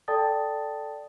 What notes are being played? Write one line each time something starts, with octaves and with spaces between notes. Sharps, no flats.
A4 D5 G5 A5 D#6 A6